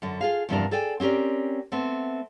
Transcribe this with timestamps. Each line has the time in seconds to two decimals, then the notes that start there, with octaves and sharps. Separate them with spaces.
0.02 F#2 D3
0.21 F4 G#4 F5
0.49 E2 G2 C3 F3 D4 A#4
0.71 G#4 A4 D5 G5 G#5
1.00 C4 C#4 G4 A#4 D5
1.72 A3 B3 C4